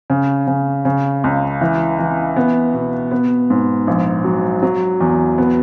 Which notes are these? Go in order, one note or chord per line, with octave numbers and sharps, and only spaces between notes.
C#3
C#3
C#3
C#2
E3
E3
B3
B2
B3
G#2
A#1
F#3
F#3
E2
B3